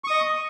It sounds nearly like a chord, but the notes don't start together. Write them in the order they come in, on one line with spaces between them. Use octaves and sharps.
C#6 D#6 D#5